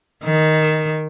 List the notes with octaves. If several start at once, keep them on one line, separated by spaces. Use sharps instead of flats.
D#3